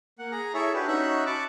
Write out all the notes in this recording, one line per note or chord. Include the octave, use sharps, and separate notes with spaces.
A#3 F#5
G#4 A#5
E4 G#4 A4 C#5 E5
D4 F#4 G4 B4
C#4 D#4 F#4 E5 F#6
A5 B5 C#6 D6 F#6